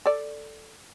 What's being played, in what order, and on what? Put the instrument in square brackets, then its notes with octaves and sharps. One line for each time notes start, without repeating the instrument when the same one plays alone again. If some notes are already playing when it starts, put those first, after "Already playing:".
[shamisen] A4 D5